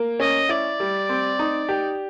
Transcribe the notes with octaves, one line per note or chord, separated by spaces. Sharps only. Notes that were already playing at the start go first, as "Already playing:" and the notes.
Already playing: A#3
C#4 D#5
E4 D5
G3
C4
D#4
G4